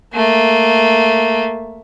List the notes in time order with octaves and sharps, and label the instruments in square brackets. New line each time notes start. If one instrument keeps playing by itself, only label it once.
[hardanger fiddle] A3 A#3